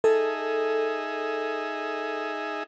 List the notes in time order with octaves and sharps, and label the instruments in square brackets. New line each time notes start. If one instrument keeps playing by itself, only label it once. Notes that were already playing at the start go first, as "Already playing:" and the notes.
[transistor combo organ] D#4 G#4 E5 [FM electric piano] A4